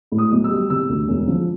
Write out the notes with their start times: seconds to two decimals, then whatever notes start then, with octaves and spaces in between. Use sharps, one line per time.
0.12 A2
0.18 D#6
0.32 B1
0.44 E6
0.50 G3
0.70 C3 E6
0.89 D2
1.08 E1
1.27 F3